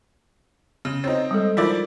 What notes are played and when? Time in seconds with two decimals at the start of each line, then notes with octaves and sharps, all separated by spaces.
0.85 C#3
1.04 C4 D#4 C#5
1.31 G3 G#3 A4
1.57 F3 D#4 E4 A#4 D5